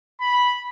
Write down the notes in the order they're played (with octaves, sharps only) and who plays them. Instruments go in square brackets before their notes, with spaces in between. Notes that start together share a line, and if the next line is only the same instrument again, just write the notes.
[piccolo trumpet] B5